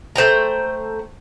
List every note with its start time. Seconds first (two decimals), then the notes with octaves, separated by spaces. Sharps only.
0.16 A3 C5 G5 A#5